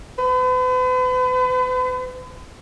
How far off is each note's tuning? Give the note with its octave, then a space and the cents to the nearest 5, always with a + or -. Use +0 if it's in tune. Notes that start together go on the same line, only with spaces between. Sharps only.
B4 +40